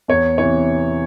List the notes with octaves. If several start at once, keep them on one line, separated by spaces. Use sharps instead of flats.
E2 C#5
C3 E3 C#5